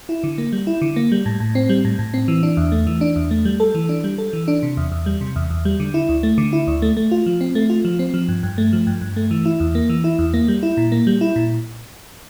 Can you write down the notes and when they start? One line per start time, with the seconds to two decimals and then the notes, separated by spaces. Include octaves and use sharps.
0.09 E4
0.24 D3
0.38 A#3
0.53 G3
0.67 E4
0.82 D3
0.96 A#3
1.12 G3
1.26 A2
1.40 A2
1.55 C4
1.69 G3
1.85 A2
1.99 A2
2.14 C4
2.28 E3
2.43 D4
2.57 E2
2.72 A3
2.87 E3
3.01 D4
3.16 E2
3.31 A3
3.45 G3
3.60 A4
3.75 E3
3.89 D4
4.04 G3
4.18 A4
4.33 E3
4.48 D4
4.63 C3
4.77 E2
4.92 E2
5.06 G3
5.21 C3
5.36 E2
5.50 E2
5.65 G3
5.80 D3
5.94 E4
6.09 D2
6.23 A3
6.38 D3
6.53 E4
6.67 D2
6.82 A3
6.97 A3
7.11 F4
7.26 F3
7.41 C4
7.55 A3
7.70 F4
7.85 F3
7.99 C4
8.14 F3
8.28 G2
8.43 G2
8.58 A3
8.73 F3
8.87 G2
9.01 G2
9.17 A3
9.31 E3
9.45 E4
9.60 E2
9.75 A#3
9.89 E3
10.04 E4
10.19 E2
10.34 A#3
10.48 G3
10.63 E4
10.77 A#2
10.92 A#3
11.07 G3
11.21 E4
11.36 A#2